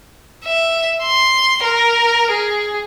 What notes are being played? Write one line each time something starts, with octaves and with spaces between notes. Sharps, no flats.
E5
C6
A#4
G#4